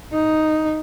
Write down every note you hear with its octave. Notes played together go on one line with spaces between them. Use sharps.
D#4